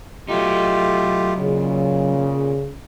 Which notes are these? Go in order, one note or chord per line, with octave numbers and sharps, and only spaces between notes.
F#3 A3 D#4 F4 G4
A#2 C#3